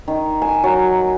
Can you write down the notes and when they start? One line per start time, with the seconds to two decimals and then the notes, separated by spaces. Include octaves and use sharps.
0.08 D#3
0.42 G#5
0.63 F#3